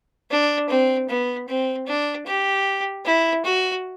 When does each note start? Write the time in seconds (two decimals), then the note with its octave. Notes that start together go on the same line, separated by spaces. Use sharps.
0.31 D4
0.69 C4
1.09 B3
1.49 C4
1.87 D4
2.27 G4
3.06 E4
3.45 F#4